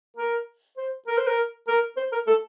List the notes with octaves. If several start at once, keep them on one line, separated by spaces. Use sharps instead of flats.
A#4
C5
A#4
C5
A#4
A#4
C5
A#4
A4